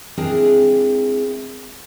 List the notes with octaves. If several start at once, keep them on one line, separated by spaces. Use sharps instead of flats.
G#3 C4 D4 E4 G#4 A#4